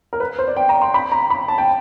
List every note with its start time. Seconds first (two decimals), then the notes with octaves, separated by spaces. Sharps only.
0.13 A#4
0.20 B4
0.39 C5
0.48 D5
0.57 G5
0.69 A#5
0.82 C6
0.94 B5
1.12 A#5
1.30 B5
1.48 A5
1.58 G5